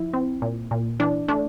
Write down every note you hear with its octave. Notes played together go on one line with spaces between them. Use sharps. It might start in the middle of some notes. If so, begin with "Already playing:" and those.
Already playing: F3 E4
C4
A#2
A#2
E3 D4
A3 D4